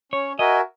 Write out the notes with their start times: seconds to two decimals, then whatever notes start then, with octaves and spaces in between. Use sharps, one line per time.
0.12 C#4 C#5
0.39 F#4 A#4 D#5 E5 G#5